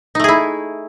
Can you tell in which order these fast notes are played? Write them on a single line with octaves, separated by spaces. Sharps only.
D#4 A3 G#4 E4